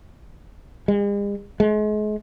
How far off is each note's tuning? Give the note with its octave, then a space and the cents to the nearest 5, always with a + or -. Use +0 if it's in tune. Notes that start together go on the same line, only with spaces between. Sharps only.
G#3 -45
G#3 +35